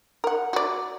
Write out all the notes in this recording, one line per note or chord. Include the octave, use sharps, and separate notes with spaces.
A#4 F#5
F#4 D5